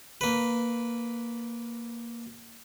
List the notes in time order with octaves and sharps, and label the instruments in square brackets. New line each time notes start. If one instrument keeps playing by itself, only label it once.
[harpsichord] A#3 B4